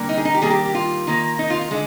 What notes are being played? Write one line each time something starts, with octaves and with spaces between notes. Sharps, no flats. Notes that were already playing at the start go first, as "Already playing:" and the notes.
Already playing: D3 G3 A#3
D#4
G#4
D#4
G4
D#3 G3 A#3 G#4
G4
G4
F4
D#3 A#3
D#4
F4
F4
D3 G#3